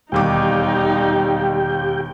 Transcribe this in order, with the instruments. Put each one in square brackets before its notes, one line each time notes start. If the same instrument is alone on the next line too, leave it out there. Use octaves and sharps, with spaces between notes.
[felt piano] E1 D#2 D6 [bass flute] G3 [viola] D#4 [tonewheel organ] G4 G5